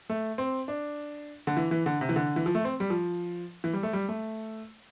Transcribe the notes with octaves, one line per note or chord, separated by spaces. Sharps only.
A3
C4
D4
D3
E3
E3
D3
C3
E3
D3
E3
F3
A3
C4
G3
F3
E3
G3
A3
G3
A3